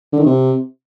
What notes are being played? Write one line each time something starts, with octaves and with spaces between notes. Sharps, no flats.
D3
D#3
C3